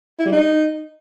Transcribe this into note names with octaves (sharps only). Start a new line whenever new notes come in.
E4
G3
D#4